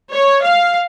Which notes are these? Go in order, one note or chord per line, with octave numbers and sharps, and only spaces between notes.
C#5
F5